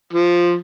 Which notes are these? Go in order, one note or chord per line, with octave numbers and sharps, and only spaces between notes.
F3